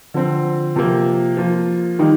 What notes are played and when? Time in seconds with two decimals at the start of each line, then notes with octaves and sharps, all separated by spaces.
0.14 D3 F3 C4
0.76 C3 F3 A#3
1.37 F3 A#3 F4
1.99 D#3 G3 A#3 D#4